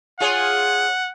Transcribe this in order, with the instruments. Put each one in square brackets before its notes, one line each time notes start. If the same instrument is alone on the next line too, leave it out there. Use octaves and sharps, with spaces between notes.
[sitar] F4 G#4 C#5 [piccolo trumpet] F#5